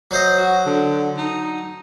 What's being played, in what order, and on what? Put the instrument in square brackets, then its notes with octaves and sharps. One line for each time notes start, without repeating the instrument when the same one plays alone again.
[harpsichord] F#3 C5 D#5
[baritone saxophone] F#4
D3
D#4